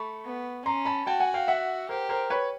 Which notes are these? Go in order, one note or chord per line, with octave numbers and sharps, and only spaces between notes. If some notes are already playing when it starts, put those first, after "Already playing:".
Already playing: A3 B5 C#6
B3
C#4 A#5 C6
A5 B5
F#4 G5 A5
F#5 G#5
F5 G5
E5 F#5
G4 A#4 C5
A#4 C5
B4 C#5